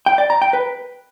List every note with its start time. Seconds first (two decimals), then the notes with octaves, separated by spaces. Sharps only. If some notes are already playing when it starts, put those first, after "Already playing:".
0.06 G5
0.18 D5
0.30 A#5
0.42 G5
0.53 B4